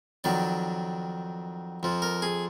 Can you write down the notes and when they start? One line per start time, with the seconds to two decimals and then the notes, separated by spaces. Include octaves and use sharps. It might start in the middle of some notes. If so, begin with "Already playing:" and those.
0.24 F2 D#3 F#3 D5
1.83 F2 F3
2.02 A#4
2.22 G#4